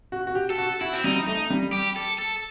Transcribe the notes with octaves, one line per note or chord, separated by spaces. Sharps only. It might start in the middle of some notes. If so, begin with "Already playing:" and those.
F#4
F#4
G4
A4
F#4
E4 F#4
C4
G3 D#4
A3 D#4
G3
G4
A4
A4